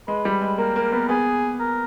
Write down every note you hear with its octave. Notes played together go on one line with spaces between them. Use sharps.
G#3 B4
G3
G#3
A#3 A#4
A#3
B3
B3 G#4
A#4